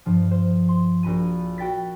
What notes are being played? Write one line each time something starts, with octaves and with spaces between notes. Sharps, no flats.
G2 F3
C5
C6
A#1 F#4 B5 D#7
F#4 G5 A6 B6